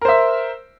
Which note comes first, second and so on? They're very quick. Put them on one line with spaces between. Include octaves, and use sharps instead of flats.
A#4 C5 E5